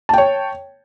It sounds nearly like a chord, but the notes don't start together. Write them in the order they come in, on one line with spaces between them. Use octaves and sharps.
A5 G5 C#5